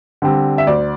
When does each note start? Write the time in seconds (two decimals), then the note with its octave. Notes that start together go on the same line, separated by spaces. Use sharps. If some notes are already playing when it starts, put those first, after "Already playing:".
0.22 D3 G3 C4
0.58 E5
0.67 D2 D5